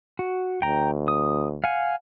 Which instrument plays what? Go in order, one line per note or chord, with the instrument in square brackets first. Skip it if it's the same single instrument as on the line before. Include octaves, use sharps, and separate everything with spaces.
[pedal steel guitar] F#4
[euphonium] D2 [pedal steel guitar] G5 A#5
[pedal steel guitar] D#6
F5 F#5 G#5